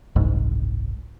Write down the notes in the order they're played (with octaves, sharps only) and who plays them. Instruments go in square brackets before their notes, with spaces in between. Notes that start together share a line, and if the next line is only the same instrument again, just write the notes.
[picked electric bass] F#1 C2 G#2